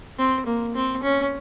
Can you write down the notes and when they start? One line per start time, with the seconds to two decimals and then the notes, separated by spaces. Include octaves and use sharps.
0.19 C4
0.46 A#3
0.76 C4
1.03 C#4